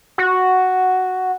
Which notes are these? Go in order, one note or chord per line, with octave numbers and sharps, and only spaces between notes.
F#4